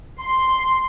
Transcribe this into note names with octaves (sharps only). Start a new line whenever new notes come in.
C6